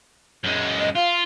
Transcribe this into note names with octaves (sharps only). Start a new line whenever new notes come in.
F#2 G#3
D#5
F4 F5